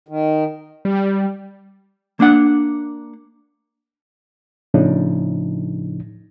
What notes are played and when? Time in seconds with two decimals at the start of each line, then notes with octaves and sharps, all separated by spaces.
0.08 D#3
0.85 G3
2.20 A#3 D4 F#5
4.74 A2 C#3 F3 D4 D#4